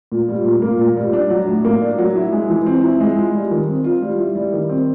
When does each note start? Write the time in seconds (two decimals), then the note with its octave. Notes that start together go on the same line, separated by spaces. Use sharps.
0.12 A#2
0.28 G3
0.45 A#2
0.62 A#3
0.79 A#2
0.97 G3
1.13 D4
1.30 F#3
1.47 A2
1.65 A#3
1.81 D4
1.98 F#3
2.16 E4
2.32 G#3
2.50 E3
2.66 C4
2.83 E4
3.00 G#3
3.18 F4
3.34 G3
3.51 D#3
3.68 C4
3.84 F4
4.02 G3
4.19 E4
4.35 G3
4.53 D#3
4.69 C4